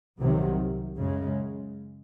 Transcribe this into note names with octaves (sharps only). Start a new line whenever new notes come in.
C2 C3 D#3 F#3
F#2 C#3 G#3